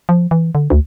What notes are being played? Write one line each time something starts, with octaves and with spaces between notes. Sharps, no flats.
F3
E3
D3
D2